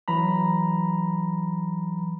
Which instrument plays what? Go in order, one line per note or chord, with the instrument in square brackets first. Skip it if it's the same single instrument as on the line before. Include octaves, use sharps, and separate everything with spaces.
[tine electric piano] E3 F#3 A#5 B5